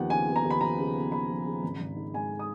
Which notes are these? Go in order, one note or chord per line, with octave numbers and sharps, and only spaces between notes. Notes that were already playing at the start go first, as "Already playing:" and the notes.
Already playing: D#2 F3 B3 F#5
C#3 G#5
B3
A#5
D#2
B5
F3 A#5
C#3
B3
D#2 B5
F3
C#3
G#1
G#1
D#3
G#2 G#5
D#6